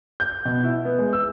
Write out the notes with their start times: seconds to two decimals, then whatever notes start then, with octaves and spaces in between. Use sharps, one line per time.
0.20 G6
0.45 B2
0.64 E4
0.85 B3
0.99 G#3
1.13 E6